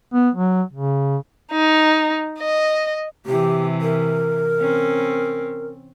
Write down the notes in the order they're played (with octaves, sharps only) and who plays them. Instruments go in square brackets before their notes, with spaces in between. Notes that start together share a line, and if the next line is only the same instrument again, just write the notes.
[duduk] B3
F#3
C#3
[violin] D#4
D#5
[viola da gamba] C3 E3 [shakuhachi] G4
[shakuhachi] A#4
[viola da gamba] C4 C#4